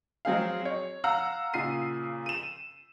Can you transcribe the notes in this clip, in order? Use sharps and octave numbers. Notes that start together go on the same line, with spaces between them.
F#3 C4 G#4 F5
C#5
F5 F#5 A#5 E6
A#2 C#3 C7 D#7
D#7 E7